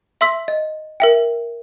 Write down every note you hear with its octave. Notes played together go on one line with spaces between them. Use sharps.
E5 C6 E6 B6
D#5
A#4 E5 G5